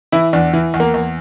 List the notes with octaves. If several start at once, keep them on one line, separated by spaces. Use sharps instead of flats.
E3 E4
E2 D4
E3
E2
A#3
E2